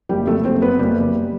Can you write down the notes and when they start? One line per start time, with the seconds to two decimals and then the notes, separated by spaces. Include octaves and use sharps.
0.09 F#1 G3 G4
0.27 F#3 A3 A4
0.45 F#1 C4 C5
0.62 F#3 B3 B4
0.79 F#1 G3 G4
0.98 F#1